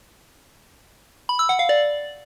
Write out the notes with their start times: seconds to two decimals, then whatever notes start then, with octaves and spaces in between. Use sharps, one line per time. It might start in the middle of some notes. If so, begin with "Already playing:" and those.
1.29 B5
1.39 E6
1.49 F#5
1.59 F5
1.69 D5